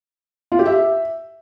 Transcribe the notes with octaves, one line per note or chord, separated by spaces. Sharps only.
F4
G4
E5